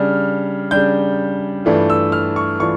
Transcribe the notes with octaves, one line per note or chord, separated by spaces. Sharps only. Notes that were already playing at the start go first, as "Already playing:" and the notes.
Already playing: C#3 G3 D4 F6
C#3 G3 D4 G6
G2 E3 A3 D4 F4
E6
F6
C#6
E3 A3 D4 F4 C#6